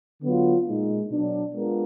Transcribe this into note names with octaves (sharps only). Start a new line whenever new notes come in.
D3 F#3 B3 F4
A#2 G#3 D#4
B2 F#3 D4
G#3 B3 D4 F4 A#4